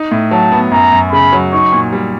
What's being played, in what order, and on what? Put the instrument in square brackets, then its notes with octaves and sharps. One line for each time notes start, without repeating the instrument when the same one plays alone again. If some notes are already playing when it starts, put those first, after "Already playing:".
Already playing: [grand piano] D#4
A2
[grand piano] F#3 [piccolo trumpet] A5
[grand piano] B3
[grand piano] F#2 [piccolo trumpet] A#5
[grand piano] F#2
[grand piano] C#3 [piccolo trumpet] B5
[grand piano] F#3
[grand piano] D#4 [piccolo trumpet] C#6
[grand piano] A#2
G3